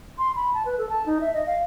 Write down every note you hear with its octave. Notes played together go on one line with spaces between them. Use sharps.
C6
B5
A5
B4
A4
A5
D#4
E5
D#5
F5